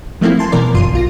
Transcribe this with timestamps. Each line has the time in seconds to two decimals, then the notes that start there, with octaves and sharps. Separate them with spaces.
0.21 F3 A3 A#3 C4 E4
0.39 G#5 A5 C6
0.52 B2 E3 A#4 D5
0.74 G1 F#2 F4 C6 D#7
0.93 B1 F4 A#6